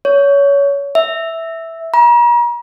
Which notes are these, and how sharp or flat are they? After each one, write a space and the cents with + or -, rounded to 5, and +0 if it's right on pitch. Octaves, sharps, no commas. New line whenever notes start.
C#5 +25
E5 -5
A#5 +40